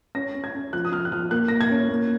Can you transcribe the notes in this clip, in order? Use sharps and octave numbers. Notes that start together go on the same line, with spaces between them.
C#4 A#6
C#4
G#6
C#4
F3 F#6
D#6
F3 F6
F#6
F3 F6
A#3 F#6
A#3 A#6
G#6
C#4
A#3